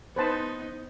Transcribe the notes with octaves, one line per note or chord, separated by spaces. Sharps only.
B3 D#4 B4 C5 A5